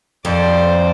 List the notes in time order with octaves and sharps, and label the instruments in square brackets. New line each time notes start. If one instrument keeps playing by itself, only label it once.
[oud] F2 [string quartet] C5 D5